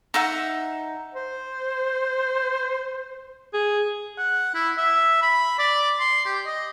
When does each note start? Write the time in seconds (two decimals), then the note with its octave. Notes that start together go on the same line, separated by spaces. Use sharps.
0.14 D#4 E5 F#5
1.15 C5
3.53 G#4
4.19 F#5
4.55 E4
4.78 E5
5.22 B5
5.59 D5
6.00 C6
6.26 G4
6.46 D#5